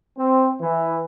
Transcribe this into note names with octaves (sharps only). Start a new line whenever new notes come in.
C4
E3